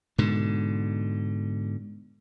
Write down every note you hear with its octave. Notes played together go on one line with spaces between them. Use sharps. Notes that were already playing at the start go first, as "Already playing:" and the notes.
G#2 B2 D3